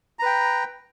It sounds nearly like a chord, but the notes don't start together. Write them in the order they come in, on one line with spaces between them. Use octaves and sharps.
A#5 B4 G5